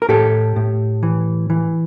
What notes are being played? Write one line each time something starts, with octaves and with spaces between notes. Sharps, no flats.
A#4
A2 G4 A4
A2
E3
E3